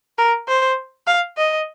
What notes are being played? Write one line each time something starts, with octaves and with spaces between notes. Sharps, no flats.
A#4
C5
F5
D#5